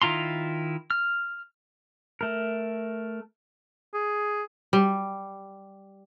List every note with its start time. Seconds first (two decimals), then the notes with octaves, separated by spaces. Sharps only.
0.02 D#3 E4 F4 A#5 C6
0.90 F6
2.21 A3 A#4
3.94 G#4
4.73 G3